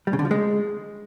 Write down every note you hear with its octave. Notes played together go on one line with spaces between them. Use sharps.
G3
C#3
D3
F3
G#3